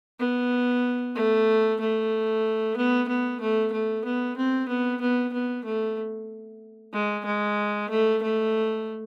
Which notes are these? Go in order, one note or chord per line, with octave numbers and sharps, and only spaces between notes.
B3
A3
A3
B3
B3
A3
A3
B3
C4
B3
B3
B3
A3
G#3
G#3
A3
A3